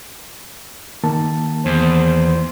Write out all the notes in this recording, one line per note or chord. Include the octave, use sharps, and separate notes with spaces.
D#3 A#3 A5
E2 C5